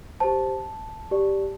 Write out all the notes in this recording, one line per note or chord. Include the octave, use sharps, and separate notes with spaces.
G4 C5 A5
G4 D5